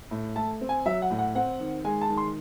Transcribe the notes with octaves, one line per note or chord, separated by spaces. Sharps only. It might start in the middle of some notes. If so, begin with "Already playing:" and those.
A2
A3 A5
C4
G#5
F#3 E5
F#5
A2
F#5
C4 F#5
D#3
G#3 G#5
A5
D#3
C6